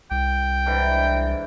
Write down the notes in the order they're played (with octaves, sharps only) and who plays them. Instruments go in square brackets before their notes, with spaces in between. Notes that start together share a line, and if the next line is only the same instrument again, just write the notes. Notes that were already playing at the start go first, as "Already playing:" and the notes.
[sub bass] C2 [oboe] G5
[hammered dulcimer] G#2 D3 E3